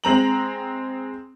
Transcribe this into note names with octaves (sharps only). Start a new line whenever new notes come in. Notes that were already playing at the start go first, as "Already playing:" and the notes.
G#3 C4 A#5 F#7